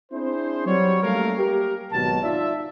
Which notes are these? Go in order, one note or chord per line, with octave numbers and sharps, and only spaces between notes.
C4 D4 E4 G#4 C5
F#3 G3 C#5
G3 A3 A#3 C#4 A#4 F5
G4 A#4
G#1 B2 F#3 A5
D#4 F4 D5 E5